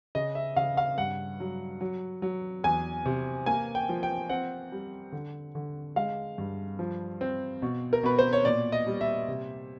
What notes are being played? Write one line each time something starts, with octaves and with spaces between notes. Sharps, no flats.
C#3 D#5
E5
C#3 F5
F5
G2 F#5
F#3
F#3
F#3
E2 G#5
C3
A#3 G#5
G5
F3
G5
C4 F#5
G3
D3
D3
G#3 F5
G2
F3
C4
B2
A#4
B2 B4
C5
C#5
A#2 D5
D#5
G3
E5
C3